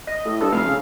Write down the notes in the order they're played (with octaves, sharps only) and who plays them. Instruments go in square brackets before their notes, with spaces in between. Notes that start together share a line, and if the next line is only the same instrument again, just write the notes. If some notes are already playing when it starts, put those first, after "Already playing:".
[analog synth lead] D#5
[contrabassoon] A2
[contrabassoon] G2 [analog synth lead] A4
[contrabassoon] F1 [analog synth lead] F5
[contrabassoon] C#3